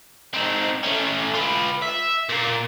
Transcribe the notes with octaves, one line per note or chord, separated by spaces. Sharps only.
C4 D#4
A3 C#4
F4 B4
E5
A#2 A#3